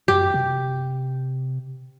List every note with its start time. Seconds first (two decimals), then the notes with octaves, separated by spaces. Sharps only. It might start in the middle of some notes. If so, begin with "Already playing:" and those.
0.08 F#2 G4
0.34 C3